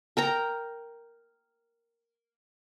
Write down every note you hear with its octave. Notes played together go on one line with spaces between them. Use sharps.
A#4 G5 A#5